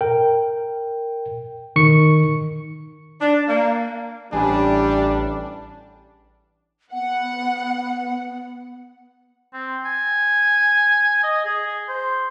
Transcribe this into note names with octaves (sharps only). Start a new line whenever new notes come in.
A#4 G5
D#3 C#6 C#7
D4
A#3
A1 G3 D4 G#4
B3 F#5
C4
G#5
D#5
G#4
C5